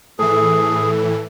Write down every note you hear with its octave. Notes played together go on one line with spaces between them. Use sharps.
A2 E3 G#4 A4